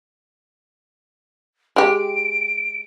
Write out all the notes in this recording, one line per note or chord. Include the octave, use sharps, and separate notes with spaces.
G#3 G4 D7